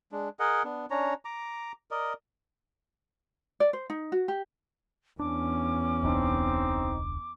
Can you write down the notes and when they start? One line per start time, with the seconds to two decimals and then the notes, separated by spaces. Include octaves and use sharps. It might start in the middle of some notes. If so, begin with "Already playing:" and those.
0.12 G#3 D4
0.39 G#4 A#4 D#5 F#5
0.64 B3 D4
0.90 C#4 D4 C#5 A#5
1.25 A#5 D6
1.91 A#4 D5 D#5
3.60 D5
3.73 C5
3.90 D#4
4.12 F#4
4.28 G4
5.19 E2 C#4 D4 D6
6.03 E1 C#2 C4 D4 D#4